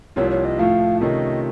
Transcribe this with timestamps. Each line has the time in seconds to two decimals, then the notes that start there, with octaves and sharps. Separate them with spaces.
0.16 C2 C3 F3 A#3 F4 C#5
0.30 C#5
0.44 D#5
0.58 A2 F3 A3 F5
1.01 C3 D#3 A3 C#4 F4 D#5